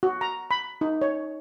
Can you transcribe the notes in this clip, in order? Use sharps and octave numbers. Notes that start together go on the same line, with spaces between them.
F#4
A#5
B5
D#4
C#5